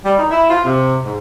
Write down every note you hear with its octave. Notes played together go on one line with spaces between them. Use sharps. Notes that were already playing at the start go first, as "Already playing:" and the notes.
G3
D#4
E4
F4
C3
G#2